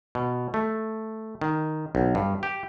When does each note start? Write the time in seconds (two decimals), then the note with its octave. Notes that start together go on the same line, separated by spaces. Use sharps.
0.15 B2
0.54 A3
1.42 D#3
1.95 B1
2.15 G2
2.43 G4